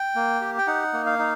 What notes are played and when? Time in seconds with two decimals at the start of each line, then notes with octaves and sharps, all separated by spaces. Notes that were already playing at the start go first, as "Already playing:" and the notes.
Already playing: G5
0.15 A#3
0.41 G4
0.58 G5
0.67 D#4 F#5
0.93 A#3
1.06 F5
1.19 D#4